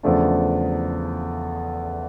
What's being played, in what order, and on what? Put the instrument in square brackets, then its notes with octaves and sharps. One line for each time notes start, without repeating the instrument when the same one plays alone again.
[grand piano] E2 C#3 F3 A3 D4